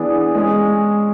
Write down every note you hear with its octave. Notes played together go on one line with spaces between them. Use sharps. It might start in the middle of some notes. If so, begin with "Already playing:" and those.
Already playing: E3 B3 D4 G#4
G#3 C#4 G#4